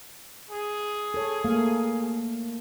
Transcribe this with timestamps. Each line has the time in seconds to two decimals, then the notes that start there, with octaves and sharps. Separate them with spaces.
0.51 G#4
1.14 A4 C#5
1.45 A3 A#3 F5